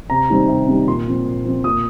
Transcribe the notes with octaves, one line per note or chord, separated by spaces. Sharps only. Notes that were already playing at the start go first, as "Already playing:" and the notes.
C3 A#5
D#3 G3 C4
C3
D#3 G3 C4
A#2 C6
F3 C4
A#2
F3 C4
A#2 D#6